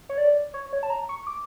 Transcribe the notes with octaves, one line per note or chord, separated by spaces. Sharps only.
C#5
D5
C#5
C#5
A5
A#5
C#6
D6